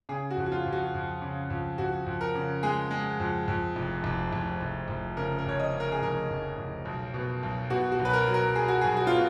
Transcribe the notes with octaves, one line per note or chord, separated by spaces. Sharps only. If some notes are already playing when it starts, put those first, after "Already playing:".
C#3 G#4
F#4
F2
F#4
F4
F2
F#4
F2
C#3
F2
F2 F#4
F2
A#4
C#3
G#3 G#4
G#3
F2
F2
F1
F1
F1
F1
F1
C#3 A#4
A#4
F2 C#5
D#5
C#3
A#4
G#4
F1 A#4
F1
F1
B1
B2
B1
B2 F#4
F#4
B1
B4
A#4
F#3
A#4
F#3 G#4
F#4
B1 G#4
F#4
F4
B2